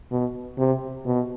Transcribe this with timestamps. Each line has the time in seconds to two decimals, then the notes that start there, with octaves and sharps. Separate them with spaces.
0.11 B2
0.58 C3
1.06 B2